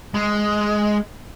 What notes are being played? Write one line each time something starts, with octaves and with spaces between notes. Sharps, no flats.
G#3